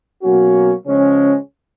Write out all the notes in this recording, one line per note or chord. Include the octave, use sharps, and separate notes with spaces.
B2 F#3 A#3 C#4 F#4
C#3 F3 G#3 C#4